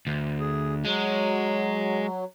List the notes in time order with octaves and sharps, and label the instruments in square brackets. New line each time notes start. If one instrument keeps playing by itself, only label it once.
[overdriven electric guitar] D2
[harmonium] G#4
[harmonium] F#3 [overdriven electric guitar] G#3